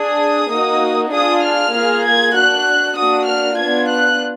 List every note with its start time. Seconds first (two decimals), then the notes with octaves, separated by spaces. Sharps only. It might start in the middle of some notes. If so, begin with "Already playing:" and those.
Already playing: D4 G#4 D#6
0.51 A#3 D#4 F#4
1.12 D4 F4 G#4 D#6
1.43 F6
1.74 A#3 F4 G#4
2.04 G#6
2.35 D4 F#4 F#6
2.96 A#3 D4 F#4 D#6
3.27 F6
3.57 B3 D4 F4 G#6
3.88 F#6